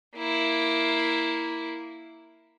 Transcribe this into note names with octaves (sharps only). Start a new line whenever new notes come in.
A#3 E4